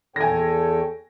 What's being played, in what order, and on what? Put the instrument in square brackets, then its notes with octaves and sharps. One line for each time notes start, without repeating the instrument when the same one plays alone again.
[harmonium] E2 C#5 G5 [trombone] A4 [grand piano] G#5 A#6